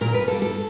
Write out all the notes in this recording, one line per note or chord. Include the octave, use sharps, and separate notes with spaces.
A#2 A#4
B4
G3 A#3 A4
A4